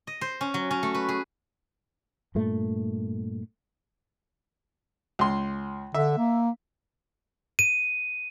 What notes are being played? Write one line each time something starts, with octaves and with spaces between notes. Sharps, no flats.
D#5
C5
C#4
F#3
C#4
A3
B4
G#4
G2 A#2 A3
C#2 C6
D3 E5
A#3
D#7